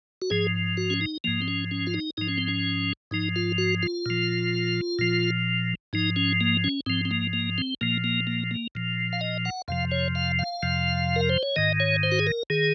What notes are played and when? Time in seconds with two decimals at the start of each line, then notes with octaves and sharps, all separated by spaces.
0.22 F#4
0.30 G#2 F3 G#4
0.77 F#4
0.90 C#4
1.01 D#4
1.24 G#2 F3 A#3
1.42 C4
1.48 C#4
1.71 C#4
1.87 F4
1.94 D#4
2.17 G#2 F3 D#4
2.29 C#4
2.38 C4
2.48 C#4
3.11 G#2 F3 D#4
3.36 F4
3.58 F#4
3.83 F4
4.06 A#2 F3
4.99 A#2 F3
5.93 G#2 F3 D#4
6.16 C#4
6.41 A#3
6.64 C#4
6.86 G#2 F3 C4
7.05 C4
7.11 A#3
7.33 A#3
7.58 C4
7.81 A#2 F3 A#3
8.04 A#3
8.27 A#3
8.51 A#3
8.75 A#2 F3
9.13 F5
9.21 D#5
9.45 F#5
9.68 F2 C3 F3 F5
9.91 C#5
10.15 F5
10.39 F5
10.63 F2 C3 F3
11.16 A#4
11.30 C5
11.43 C#5
11.56 G#2 D#3 D#5
11.80 C#5
12.03 C5
12.12 F#4
12.19 G#4
12.27 A#4
12.50 D#3 G#4